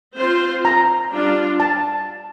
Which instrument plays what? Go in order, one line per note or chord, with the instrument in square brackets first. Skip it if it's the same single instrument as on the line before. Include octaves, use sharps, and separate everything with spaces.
[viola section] C4 F4 C5
[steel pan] A#5
[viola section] G3 D4 F4
[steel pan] A5